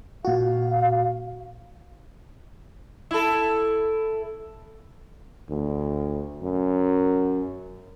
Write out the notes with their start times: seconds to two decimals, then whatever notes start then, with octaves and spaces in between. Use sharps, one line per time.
0.25 A#2 F#4 F5
3.11 E4 A4
5.50 D2
6.42 F#2